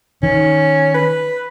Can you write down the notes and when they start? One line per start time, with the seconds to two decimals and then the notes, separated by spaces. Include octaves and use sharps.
0.23 D#3 C#4
0.94 B4